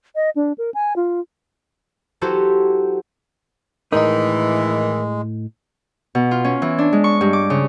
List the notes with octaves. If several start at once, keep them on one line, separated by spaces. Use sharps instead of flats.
D#5
D4
A#4
G#5
F4
F#3 E4 F#4 G4 A4 C5
A2 D#3 E3 G#3 D#4 A#4 D#5
B2
F4
C#4
E3
D4
G#3
C#6
G2
D6
C#3